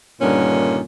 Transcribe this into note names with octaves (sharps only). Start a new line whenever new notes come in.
G2 A#2 D3 D#3 C#4